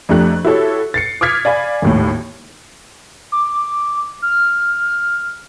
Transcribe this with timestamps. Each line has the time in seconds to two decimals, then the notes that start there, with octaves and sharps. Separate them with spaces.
0.09 F2 A3 D4 G4 A#5 F#6
0.45 E4 F#4 G4 A4 C#5
0.94 A6 C7 C#7
1.21 D6 D#6 F6 G#6 B6
1.45 D5 F5 G#5 B5
1.82 G#1 D#2 A2
3.32 D6
4.22 F6